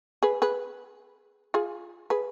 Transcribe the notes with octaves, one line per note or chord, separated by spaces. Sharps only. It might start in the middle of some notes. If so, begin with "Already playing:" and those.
G#4 B4
G#4 B4
F4 G#4
G#4 B4